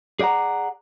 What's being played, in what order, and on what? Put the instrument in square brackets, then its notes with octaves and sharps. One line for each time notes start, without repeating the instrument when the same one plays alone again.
[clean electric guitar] G#4 D5 D#5 F#5 A#5